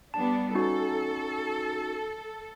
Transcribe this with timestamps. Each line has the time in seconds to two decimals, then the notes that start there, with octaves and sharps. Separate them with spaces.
0.14 G3 B3 D4 A5
0.55 C#4 D#4 F#4 A4